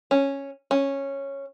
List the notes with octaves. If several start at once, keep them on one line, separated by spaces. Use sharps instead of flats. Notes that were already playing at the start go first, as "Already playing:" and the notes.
C#4
C#4